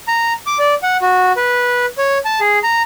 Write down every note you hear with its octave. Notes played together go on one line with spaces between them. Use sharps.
A#5
D6
D5
F#5
F#4
B4
C#5
A5
G#4
A#5